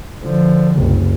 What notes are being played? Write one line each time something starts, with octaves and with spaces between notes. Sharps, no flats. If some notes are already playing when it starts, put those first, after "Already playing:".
D3 F3
F#1 C2